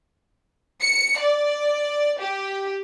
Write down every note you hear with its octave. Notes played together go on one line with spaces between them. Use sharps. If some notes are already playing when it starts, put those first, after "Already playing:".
C#7
D5
G4